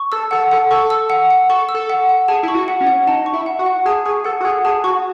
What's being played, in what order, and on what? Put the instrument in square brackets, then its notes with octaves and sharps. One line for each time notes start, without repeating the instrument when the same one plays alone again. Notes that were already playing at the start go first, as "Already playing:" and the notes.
Already playing: [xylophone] C#6
[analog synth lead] A4 [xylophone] E6
[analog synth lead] A4 [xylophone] F#5
[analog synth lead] A4 [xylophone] F#5
[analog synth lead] A4 [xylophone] C#6
[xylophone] E6
F#5
F#5
[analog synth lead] A4 [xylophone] C#6
[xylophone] E6
[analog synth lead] A4
[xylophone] F#5
F#5
[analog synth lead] G#4 [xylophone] A5
[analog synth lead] E4
[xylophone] C#6
[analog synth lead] F#4
[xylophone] F#5
[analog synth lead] C#4
[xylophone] F#5
[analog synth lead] D#4 [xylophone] A5
[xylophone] C#6
[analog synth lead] E4
[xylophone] F#5
[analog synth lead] F#4
[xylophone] F#5
[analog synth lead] G#4 [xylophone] A5
[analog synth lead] G#4 [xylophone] C#6
[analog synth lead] A4 [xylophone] F#5
[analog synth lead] F#4
[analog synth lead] G#4 [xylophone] F#5
[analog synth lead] G#4 [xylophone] A5
[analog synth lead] F#4 [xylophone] C#6